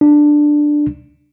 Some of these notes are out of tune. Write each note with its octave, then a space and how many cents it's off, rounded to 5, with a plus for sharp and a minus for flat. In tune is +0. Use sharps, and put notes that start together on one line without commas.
D4 +10